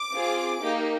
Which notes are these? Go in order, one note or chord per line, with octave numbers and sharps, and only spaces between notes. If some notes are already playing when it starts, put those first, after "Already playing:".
Already playing: D6
C4 F4 G#4
A#3 D#4 G4